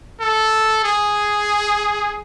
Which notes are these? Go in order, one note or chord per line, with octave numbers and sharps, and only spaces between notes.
A4
G#4